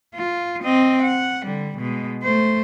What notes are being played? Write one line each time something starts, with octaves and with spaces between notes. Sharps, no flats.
F4
C4 D#5
F#5
D3 G3
B2 G#3
A3 C5